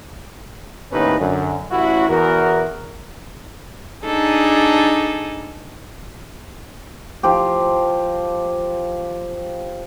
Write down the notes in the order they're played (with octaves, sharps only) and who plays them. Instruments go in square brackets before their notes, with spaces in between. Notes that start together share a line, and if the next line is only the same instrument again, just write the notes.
[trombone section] D#2 A2 C3 C#4 D#4 B4
F#2 D3
A1 E4 F#4
E2 F#4 A#4
[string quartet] D4 D#4 G#4 A4
[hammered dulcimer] F3 G4